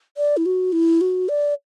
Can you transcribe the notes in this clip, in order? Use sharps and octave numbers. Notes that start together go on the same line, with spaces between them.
D5
E4
F#4
E4
F#4
D5